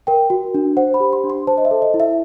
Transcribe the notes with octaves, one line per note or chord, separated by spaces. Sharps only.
A#4 G5
F#4
D4
C5 F#5
B5
G4
C6
D4
C6
C5 A5
D#5
E5
A4
D#5
E4
E5